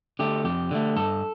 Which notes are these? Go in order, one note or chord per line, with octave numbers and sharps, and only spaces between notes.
D3 A3 G4
F2 G4
D3 A3
G2 A4